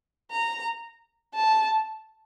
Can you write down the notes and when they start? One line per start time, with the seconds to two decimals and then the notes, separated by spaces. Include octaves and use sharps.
0.32 A#5
1.35 A5